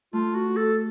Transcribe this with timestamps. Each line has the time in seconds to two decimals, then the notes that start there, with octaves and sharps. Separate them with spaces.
0.13 A3 F4
0.35 F#4
0.56 A4